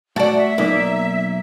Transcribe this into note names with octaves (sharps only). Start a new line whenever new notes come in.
A3 F#4 D5 A5
E5
B1 A#3 D#4 D5